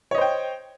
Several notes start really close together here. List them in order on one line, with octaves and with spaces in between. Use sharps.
C#5 D#5 C5 G5